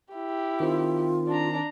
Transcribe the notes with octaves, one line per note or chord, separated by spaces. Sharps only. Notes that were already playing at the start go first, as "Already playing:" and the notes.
E4 G4
D#3 C4 F4
D4 A#5